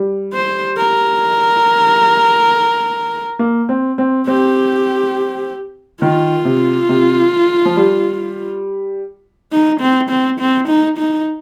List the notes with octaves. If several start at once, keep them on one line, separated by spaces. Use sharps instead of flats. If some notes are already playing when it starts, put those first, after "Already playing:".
Already playing: G3
C5
A#4
A#3
C4
C4
C4 G4
D#3 F4
C3
C3
F3
G3
D#4
C4
C4
C4
D#4
D#4